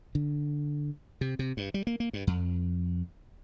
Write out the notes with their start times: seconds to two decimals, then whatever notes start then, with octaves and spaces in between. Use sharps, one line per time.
0.15 D3
1.21 C3
1.39 C3
1.57 G2
1.74 G3
1.87 A#3
2.00 A#3
2.13 G2
2.27 F2